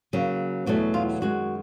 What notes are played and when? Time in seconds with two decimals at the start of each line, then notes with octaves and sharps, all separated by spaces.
0.13 C#3 F#3 A#3
0.66 E2 B2 F#3 A3 F#4
0.94 F4
1.21 F#2 D#3 G#3 F#4